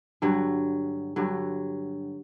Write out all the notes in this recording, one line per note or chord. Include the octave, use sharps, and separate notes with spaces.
G2 D3 F#3
G2 D3 F#3